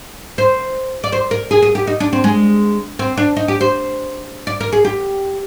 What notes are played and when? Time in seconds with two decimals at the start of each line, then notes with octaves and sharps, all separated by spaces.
0.38 C5
1.04 D5
1.12 C5
1.31 A#4
1.51 G#4
1.62 G#4
1.75 G4
1.87 D#4
2.00 D4
2.13 C4
2.24 G#3
2.99 C4
3.17 D4
3.37 D#4
3.48 G4
3.61 C5
4.47 D5
4.60 A#4
4.72 G#4
4.85 G4